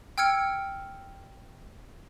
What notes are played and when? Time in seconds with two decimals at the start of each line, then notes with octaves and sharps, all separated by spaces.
0.18 G5 E6 F6 G#6 C#7 D7